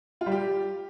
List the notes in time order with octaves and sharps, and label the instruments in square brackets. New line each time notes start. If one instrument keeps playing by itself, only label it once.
[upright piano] F4
G3
G4